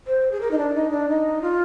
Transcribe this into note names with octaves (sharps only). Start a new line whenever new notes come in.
C5
G#4
A#4
D#4
D4
D#4
D4
D#4
F4